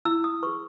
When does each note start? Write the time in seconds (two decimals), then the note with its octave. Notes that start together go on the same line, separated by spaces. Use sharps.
0.05 E4 E6
0.24 D#6
0.43 G#4 B4 C#6